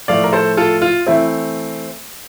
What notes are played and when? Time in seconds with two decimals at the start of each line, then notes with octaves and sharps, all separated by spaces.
0.08 A2 F3 A3 D5 F5
0.24 A#4
0.33 A4 C5
0.57 F4 A4
0.82 F4
1.07 E3 A3 C4 E4